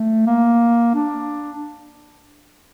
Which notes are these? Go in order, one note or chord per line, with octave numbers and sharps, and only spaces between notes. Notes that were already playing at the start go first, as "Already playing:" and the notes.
Already playing: A3
A#3
D4